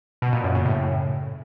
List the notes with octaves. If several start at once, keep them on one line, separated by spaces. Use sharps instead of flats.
B2
A#2
F#2
C#3
A2